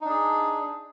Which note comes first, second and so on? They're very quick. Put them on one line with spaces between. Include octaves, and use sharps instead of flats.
D#4 D4 G#4